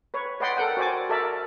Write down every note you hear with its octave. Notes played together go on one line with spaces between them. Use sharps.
B4 C#5
B4 D5 D#5 F#5 G5 C6
A4 A#4 F#5 G5
F#4 C5 D5 G#5 D6
A4 A#4 D5 E5 A5